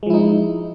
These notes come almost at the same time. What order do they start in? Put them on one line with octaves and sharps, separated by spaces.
G#3 F3 E4 D#4